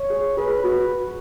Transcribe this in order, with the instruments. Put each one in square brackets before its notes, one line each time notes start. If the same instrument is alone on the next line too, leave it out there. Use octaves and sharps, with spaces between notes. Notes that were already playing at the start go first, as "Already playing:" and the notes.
Already playing: [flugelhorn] C#5
[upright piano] G#4
[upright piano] G#4 [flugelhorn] B4
[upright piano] F#4